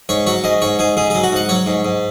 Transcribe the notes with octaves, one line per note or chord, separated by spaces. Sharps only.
G#2 C#5
F#3 C#5
G#2 D#5
G#2 C#5
G#2 G#4
G#2 G#4
F#3 G#4
F#4
G#2 F#5
F#3 C#5
G#2
G#2